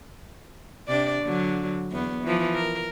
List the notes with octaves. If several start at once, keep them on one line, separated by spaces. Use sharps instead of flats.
C3 D4 D5
D3 F#3
E2 B3
E3 F3
A#4